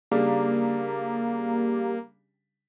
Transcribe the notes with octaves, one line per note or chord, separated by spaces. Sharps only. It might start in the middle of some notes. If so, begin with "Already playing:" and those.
C#3 G3 A#3 D4